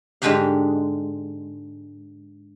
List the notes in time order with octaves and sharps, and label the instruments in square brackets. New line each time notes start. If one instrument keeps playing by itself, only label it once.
[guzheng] G#2 D3 G#3 D4 G4 F5